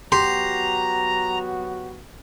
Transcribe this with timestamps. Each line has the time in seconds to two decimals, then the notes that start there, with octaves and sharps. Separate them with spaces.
0.12 F#3 B3 F#4 G4 A#5 C6